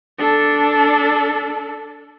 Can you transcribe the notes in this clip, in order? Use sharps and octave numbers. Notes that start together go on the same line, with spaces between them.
D4 A4